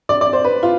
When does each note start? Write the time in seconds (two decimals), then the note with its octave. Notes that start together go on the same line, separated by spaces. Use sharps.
0.09 D5
0.21 D5
0.33 C5
0.44 B4
0.63 F4